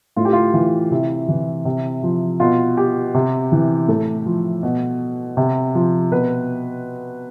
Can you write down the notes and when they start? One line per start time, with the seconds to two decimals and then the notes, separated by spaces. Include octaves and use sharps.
0.16 A2 F4
0.25 G4
0.33 F4
0.54 E3 F4
0.91 C3 E4
1.28 E3
1.65 C3
2.03 F3
2.40 B2 F4
2.77 G4
3.14 C3
3.52 E3
3.88 A2 A4
4.26 F3
4.63 B2
5.37 C3
5.75 F3
6.11 B2 B4